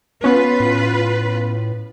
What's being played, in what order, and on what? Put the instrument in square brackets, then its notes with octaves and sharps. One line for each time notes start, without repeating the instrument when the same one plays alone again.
[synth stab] B3 C#4 [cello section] F4 B4
[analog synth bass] A2